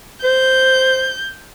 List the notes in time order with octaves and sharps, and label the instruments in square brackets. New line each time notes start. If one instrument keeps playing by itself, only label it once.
[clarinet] C5 [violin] G6